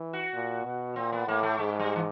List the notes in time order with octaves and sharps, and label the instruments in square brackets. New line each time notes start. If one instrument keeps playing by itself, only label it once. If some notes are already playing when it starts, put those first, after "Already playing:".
Already playing: [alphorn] E3
[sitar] F#4
[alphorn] A#2
B2
[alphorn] A#2 [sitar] C4
[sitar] B3
[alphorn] A2 [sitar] A#3
[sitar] A3
[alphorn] G#2 [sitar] G#3
[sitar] G3
E3